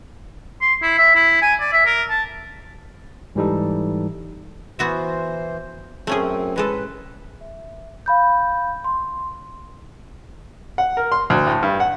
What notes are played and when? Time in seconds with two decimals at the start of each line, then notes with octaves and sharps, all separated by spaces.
0.61 C6
0.82 E4
0.98 E5
1.15 E4
1.42 G#5
1.60 D5
1.73 E5
1.86 A#4
2.09 A5
3.35 G#2 E3 G3 D#4 A4
4.79 E3 B3 F#4 C5 E5
6.07 F#2 A3 C4 C#4 G#4
6.56 A2 G#3 A4 B4
7.41 E5
8.06 F5 B5 G6
8.84 C6
10.78 F#5
10.97 A#4
11.12 C6
11.30 D2
11.47 A2
11.63 G2
11.80 F#5